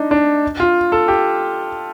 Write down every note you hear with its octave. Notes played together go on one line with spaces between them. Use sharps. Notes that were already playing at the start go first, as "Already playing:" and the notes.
Already playing: D4 D#4
D4
F4
A4
G4